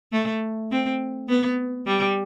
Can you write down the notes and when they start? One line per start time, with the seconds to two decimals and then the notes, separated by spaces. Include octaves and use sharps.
0.12 A3
0.71 C4
1.29 B3
1.87 G3